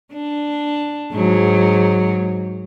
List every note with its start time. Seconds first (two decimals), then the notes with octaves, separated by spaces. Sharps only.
0.12 D4
1.12 G#2 F#3